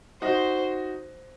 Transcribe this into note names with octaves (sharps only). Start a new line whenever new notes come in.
D#4 F#4 C5